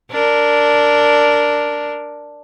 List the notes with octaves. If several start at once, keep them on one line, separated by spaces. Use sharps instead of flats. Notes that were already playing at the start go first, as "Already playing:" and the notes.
D4 A#4